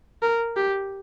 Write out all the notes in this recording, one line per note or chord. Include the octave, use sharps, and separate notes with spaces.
A#4
G4